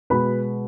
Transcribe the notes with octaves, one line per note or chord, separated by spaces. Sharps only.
B2 G#3 B3 B4 B5